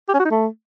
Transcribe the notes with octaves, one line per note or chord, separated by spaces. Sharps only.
G4
C#4
F#4
D#4
A3